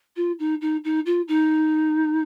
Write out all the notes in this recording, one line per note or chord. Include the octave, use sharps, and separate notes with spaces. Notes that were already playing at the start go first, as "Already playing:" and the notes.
F4
D#4
D#4
D#4
F4
D#4